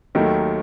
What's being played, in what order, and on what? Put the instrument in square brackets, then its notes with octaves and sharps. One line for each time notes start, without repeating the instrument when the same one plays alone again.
[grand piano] D#2 D#3 F#3 A3